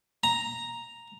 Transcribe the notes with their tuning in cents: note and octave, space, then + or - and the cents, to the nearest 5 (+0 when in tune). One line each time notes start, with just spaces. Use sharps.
A#5 +0